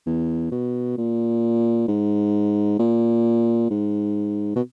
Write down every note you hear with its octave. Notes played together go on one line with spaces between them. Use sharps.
E2
B2
A#2
G#2
A#2
G#2
B2